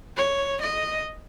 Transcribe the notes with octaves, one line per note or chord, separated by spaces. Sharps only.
C#5
D#5